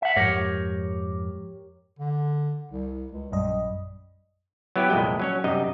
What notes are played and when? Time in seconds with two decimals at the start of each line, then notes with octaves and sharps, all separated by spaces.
0.02 E5 F#5
0.16 F2 G#2 G4 A#4 C#5
1.99 D3
2.71 C2
3.12 C#2
3.32 A#1 F#2 G3 D#5
4.76 F#3 B3 E4 G4
4.90 C2 F2 A#2 G#3 B4 G5
5.20 F#3 C#4 C#5
5.44 F#2 C3 G3 D#4 D#5